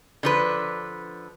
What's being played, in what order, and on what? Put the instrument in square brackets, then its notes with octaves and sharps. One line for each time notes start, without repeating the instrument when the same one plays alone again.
[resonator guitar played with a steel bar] D3 F3 B4